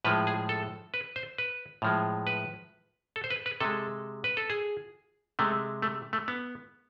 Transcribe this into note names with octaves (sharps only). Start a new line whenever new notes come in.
A2 F3 G#3 B4
G#4
A4
B4
C5
B4
A2 F3 G#3
B4
A4
C5
B4
B4
C3 G#3 A4
B4
A4
G#4
C3 G#3 A3
A3
A3
B3